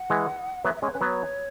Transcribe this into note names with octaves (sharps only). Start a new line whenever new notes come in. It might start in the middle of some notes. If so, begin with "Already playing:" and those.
Already playing: F#5
E3 G#3
F#3 B3 E5
E5
G#3 C#4 C#5
C#4 B4
F#3 B3 C#5